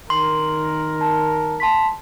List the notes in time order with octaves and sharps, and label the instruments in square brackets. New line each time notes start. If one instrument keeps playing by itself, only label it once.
[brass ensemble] D#3 A#4 [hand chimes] C6
[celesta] A5
A5 C6 B6